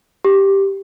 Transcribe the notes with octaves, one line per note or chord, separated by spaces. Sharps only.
G4